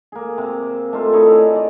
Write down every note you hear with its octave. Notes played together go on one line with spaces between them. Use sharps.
A#3 G#4
C3
A3 D#4 F4
D#4 E4 C#5 D5
D#4 G#4
D5